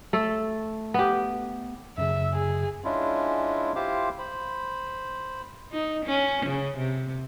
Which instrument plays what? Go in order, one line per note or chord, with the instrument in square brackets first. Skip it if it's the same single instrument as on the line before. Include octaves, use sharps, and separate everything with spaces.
[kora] A3 A4
B3 G4
[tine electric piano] F#2 C#3 [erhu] E5
[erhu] G#4
[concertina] G#3 C#4 D4 E4 F4
E4 F4 G4 C5 F5 D6
C5 B5
[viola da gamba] D#4
C#4
C#3
C3